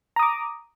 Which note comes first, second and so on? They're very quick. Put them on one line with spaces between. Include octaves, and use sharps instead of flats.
A#5 D#6 D6